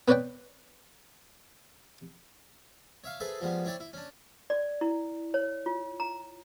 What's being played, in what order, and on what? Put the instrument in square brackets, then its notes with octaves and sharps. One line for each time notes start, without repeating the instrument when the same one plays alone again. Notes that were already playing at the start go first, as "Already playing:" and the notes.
[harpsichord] B3 B4 C#5 D5 F#5 G5
C#5 E5 F5
G#4 A4 B4 C5 E5
F3 G3 G#3 B3
C4 E4 C#5 D5 G5
E4
C#4 D4
[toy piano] D5
E4
C#5
F4
A#5